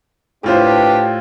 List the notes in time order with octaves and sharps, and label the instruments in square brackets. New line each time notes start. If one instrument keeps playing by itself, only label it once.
[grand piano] A2 F4 C5 [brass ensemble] D4 E4 B4 [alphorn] G4